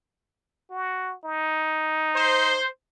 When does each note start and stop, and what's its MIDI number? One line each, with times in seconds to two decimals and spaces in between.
0.70 1.15 66
1.24 2.59 63
2.16 2.67 72